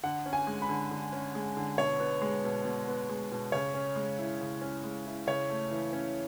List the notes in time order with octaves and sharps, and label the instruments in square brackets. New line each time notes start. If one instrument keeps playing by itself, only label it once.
[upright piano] D3 F#5
C#4
G#5
G#3
B5
D3
D3
C#4
G#3
D3
B2 C#5
B3
G#3
B2
B2
B3
G#3
B2
C#3 C#5
C#4
G#3
E4
C#3
C#4
G#3
E4
C#3 C#5
A3
E3
C#4